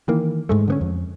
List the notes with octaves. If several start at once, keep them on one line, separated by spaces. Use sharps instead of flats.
D#3 E3 A#3
G#2 G#3 A3
D3 B3 C#4
F2